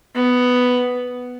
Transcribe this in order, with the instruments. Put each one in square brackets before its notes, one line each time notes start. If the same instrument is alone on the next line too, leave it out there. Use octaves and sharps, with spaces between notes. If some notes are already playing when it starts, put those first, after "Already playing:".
[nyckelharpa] B3